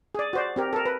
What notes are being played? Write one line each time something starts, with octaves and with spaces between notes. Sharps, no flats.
G#4 D5
F#4 C5 D5
C4 G4 A#4
A4 A#4
B4